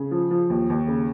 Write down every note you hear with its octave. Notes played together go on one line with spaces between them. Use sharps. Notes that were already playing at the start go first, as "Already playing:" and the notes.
Already playing: C#3
F3
F3
D#2
D#2
C#3